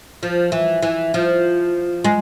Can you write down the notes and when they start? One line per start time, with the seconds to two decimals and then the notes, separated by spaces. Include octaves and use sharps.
0.23 F3
0.52 E3
0.82 E3
1.14 F3
2.04 G#3